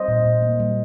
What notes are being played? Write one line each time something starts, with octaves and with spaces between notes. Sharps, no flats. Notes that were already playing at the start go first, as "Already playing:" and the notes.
Already playing: G3 C5 D#5
A#2
A#2
A#3
G3